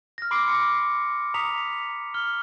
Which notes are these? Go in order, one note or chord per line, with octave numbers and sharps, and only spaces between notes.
F6 A#6
B5 C6 D6 C7 D7
C#7
A#5 D#6 B6 C#7 F7
F6 G7